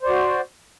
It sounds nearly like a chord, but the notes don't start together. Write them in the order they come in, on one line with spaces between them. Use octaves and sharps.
C5 D5 F#4